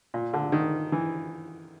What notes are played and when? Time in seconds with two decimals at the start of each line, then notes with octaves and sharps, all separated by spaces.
0.14 A#2
0.34 D3
0.52 D#3
0.92 E3